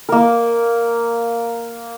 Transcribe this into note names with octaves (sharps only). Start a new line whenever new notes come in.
A#3 A#4